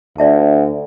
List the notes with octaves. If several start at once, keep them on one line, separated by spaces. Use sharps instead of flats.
D2 D5 E5 A5